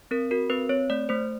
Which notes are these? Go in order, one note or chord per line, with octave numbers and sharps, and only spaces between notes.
C4 A#4
F#4 A#4
C4 B4
C4 C#5
A3 D5
A3 C5